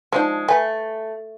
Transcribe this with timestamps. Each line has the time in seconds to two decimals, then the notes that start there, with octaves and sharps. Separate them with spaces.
0.12 F3 G#3 D4 D#4
0.48 A3 B4 G#5